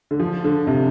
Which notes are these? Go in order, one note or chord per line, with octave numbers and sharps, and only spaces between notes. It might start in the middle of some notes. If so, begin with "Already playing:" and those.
D3
F3
D3
C3